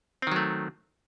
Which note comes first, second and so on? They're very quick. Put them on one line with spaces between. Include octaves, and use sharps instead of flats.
C4 D#3 F#3 A3